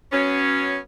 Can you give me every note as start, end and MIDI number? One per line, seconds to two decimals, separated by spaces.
0.13 0.78 54
0.13 0.78 59
0.13 0.78 61